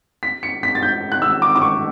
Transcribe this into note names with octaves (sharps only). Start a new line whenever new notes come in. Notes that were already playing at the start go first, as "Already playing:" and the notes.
B6
C#7
B6
A6
G6
F#6
E6
D6
D6
C#6